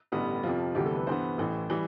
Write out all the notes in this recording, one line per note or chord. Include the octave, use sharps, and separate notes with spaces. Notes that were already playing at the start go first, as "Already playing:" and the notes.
A1 G2 D3 G3 B3
F2 C3 F3 F4
D2 C3 E3 G3 B3 G4
A4
B4
G2 E3 B3 C5
A1 A2 E3
E3 G3